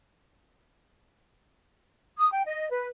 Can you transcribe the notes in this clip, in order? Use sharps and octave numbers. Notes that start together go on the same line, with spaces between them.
D#6
G5
D#5
B4